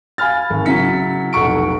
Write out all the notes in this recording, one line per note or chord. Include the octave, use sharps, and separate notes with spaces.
F5 G#5 B5 F6 A6
G#1
C#3 F#3 E4 B6 C#7
F1 B1 F#5 C#6 D7